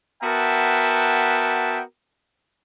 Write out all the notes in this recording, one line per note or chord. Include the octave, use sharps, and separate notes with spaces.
B3 F#4 A#4 E5 G5 A5